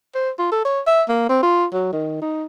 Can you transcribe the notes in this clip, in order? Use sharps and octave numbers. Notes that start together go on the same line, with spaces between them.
C5
F4
A4
C#5
E5
A#3
C4
F4
F#3
D#3
D#4